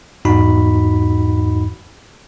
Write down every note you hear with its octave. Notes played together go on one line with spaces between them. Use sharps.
E2 G#2 D#4 F#4 B5